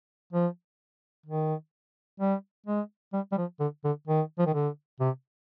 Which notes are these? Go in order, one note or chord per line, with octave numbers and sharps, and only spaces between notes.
F3
D#3
G3
G#3
G3
G3
F3
D3
D3
D#3
F3
D#3
D3
C3